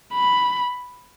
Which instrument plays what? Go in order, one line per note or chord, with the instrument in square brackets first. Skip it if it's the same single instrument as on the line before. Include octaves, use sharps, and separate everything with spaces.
[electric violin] B5